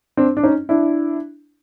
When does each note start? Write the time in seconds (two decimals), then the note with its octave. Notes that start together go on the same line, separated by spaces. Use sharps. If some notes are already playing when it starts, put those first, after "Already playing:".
0.17 C4 D4
0.37 D4
0.44 C#4 D#4
0.69 D4 E4